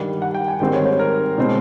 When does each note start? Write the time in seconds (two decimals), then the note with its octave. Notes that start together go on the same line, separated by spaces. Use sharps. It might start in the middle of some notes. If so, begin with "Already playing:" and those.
Already playing: G2 D#3 G3 F#5
0.22 F#5
0.35 G5
0.48 G#5
0.60 G#2 D#3 G3 C4 G5
0.73 C#5
0.85 C5
0.99 A#4
1.38 B2 G#3 C4